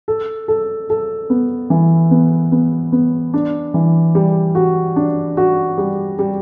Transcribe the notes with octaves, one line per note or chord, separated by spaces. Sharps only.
A4
A4
A4
B3
E3
B3
B3
B3
D4
E3
G3
F#4
D4
F#4
G3
G3